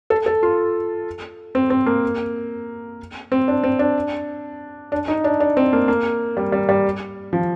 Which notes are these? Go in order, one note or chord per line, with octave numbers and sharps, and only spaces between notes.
A4
A4
F4
C4
C4
A#3
C4
D4
C4
D4
D4
D#4
D4
D4
C4
A#3
A#3
G3
G3
G3
F3